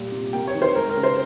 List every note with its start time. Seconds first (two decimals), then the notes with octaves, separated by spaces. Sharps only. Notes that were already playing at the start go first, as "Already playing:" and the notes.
Already playing: A#2 G3
0.12 C3
0.33 A#3 G5
0.47 C#5
0.55 D#3
0.62 C5
0.75 G#3 A#4
0.90 A#4
0.97 C#3
1.03 C5